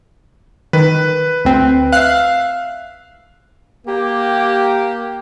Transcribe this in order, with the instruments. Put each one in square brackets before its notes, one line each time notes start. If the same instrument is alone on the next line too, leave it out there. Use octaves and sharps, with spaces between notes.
[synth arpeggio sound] D#3 [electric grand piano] B4
[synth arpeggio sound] D2 C4
[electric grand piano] E5 F5 [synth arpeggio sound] F#6 C7
[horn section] A#3 G4